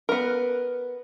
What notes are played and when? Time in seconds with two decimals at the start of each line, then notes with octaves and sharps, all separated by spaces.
0.09 B3 A#4